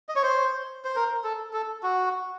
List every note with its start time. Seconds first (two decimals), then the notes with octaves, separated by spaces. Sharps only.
0.09 D#5
0.16 C#5
0.23 C5
0.85 C5
0.96 A#4
1.24 A4
1.53 A4
1.83 F#4